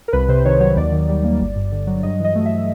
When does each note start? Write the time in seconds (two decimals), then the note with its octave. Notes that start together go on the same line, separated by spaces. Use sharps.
0.08 A#4
0.13 C2 B4
0.28 C3 C5
0.45 D#3 C#5
0.60 F#3 C#5
0.76 D#2 D5
0.92 D#3
1.09 G3
1.24 A#3
1.40 G1
1.56 G2
1.72 D3
1.87 F#3
2.03 G2 D#5
2.20 E3 D#5
2.35 A3
2.46 E5